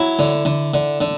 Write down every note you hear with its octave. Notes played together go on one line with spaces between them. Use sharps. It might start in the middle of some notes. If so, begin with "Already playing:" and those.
Already playing: F#3 E4
D3
D3
D3
D3